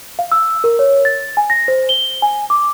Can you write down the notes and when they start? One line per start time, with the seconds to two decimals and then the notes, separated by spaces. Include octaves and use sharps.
0.19 F5
0.32 E6
0.64 A#4
0.79 C#5
1.05 A6
1.37 G#5
1.50 A#6
1.68 C5
1.89 G7
2.22 G#5
2.50 D6